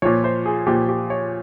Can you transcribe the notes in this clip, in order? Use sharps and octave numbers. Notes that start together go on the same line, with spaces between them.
A#2 F3 C#5
C5
G#4
A#2 F3 G4
G4
C#5